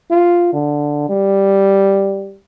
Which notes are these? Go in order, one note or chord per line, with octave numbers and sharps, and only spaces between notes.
F4
D3
G3